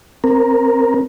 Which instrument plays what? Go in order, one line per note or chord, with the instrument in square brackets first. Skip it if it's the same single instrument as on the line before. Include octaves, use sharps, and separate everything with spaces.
[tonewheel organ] C4 A#4